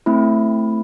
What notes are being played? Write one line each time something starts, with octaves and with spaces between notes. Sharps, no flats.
A3 C4 E4